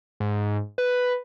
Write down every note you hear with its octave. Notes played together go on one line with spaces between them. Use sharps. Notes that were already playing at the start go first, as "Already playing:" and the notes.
G#2
B4